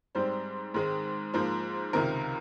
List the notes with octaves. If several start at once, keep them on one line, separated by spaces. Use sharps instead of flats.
G#2 G3 C4 C5
G#2 D#3 G#3 C4
G#2 F3 A#3 C5
C#2 C3 D#3 A#4